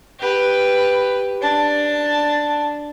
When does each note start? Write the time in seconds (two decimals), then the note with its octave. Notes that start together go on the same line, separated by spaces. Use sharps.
0.19 G4 B4
1.42 D4 A5